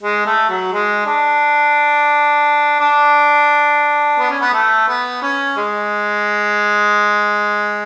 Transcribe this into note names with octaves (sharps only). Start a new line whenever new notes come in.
G#3
A3
F#3
G#3
D4
D4
B3
C#4
B3
A3
B3
C#4
G#3